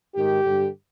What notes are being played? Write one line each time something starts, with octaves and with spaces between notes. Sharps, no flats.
G#2 D#3 G4
G2 D3